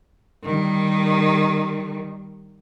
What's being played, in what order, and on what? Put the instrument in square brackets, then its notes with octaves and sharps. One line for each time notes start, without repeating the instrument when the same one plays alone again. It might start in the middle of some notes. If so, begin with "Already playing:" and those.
[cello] D#3 G3